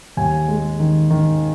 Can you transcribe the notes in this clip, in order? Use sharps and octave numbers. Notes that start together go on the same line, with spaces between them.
D#2 G#5
G#3
D#3
D#3